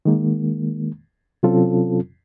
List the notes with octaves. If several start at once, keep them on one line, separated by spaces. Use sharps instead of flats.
D#3 G#3 A#3
C3 F#3 C4 C#4 F4 A4